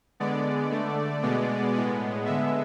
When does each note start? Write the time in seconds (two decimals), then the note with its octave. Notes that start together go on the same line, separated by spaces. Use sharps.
0.20 D3 G#3 B3 D5
0.72 D3 A3
1.22 B2 G#3 B3
1.74 A2 G#3 B3
2.26 D3 G#3 B3 E5